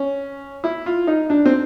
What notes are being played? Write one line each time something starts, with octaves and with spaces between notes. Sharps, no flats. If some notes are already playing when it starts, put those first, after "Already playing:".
Already playing: C#4
E4
F4
D#4
D4
C4